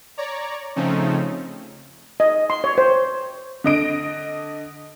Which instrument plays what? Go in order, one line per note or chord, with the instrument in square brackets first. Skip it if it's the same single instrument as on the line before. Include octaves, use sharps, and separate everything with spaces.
[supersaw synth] C#5 D5 A#5
C#3 F3 A3 C4 C#4 D#4
[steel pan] D#5
C6
C#5
C5
[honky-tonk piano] D3 D#5 D7